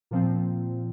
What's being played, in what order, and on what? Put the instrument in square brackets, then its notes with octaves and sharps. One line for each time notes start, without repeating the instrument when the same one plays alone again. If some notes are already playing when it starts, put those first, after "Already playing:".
[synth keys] A#2 F3 C4